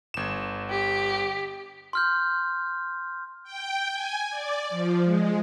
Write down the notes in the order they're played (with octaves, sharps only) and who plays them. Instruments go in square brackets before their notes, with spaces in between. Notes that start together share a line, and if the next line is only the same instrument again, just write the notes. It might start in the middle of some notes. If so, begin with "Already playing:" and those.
[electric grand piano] G1 E7
[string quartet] G4
[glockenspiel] C6 F6 G6
[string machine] G5
G#5
D5
F3
G#3